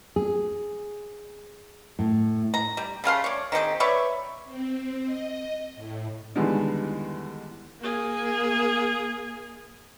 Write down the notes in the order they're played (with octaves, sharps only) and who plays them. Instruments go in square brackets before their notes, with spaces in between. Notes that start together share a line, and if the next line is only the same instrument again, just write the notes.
[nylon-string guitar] G#4
A2
[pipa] A#5
G3
C#3 A3 F5 C6
C#5 D5
D#3 C4 G4 G#4
B4 C#5 D5 E5
[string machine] C4
D#5
A2
[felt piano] E2 D3 D#3 G3 G#3 B3
[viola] A#3 G#4